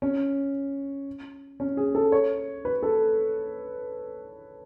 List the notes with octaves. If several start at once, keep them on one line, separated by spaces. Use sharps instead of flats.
C#4
C#4
G#4
A4
C#5
B4
A4